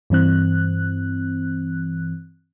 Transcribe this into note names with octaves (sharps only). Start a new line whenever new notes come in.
G2 E3 C4 F#6